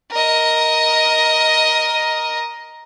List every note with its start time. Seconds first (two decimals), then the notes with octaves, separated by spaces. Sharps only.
0.11 A#4 D#5